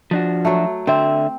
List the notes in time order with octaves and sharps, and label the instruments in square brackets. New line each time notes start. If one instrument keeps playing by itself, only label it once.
[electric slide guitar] F3 D4 F#4
[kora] F#3 A3
[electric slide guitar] D3 E5 [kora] C4